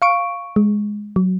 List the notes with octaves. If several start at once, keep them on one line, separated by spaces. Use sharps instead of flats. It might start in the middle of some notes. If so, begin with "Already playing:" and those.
F5 C#6 D7
G#3
F#3